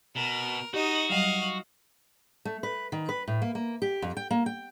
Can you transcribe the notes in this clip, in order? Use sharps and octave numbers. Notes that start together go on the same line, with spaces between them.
B2 A#4
D#4 F#4 G4 D#5
F#3 G3 D#5 F5
A3
B4
D#3
B4
A2
A#3
A#3
G4
F2
G5
A#3
G5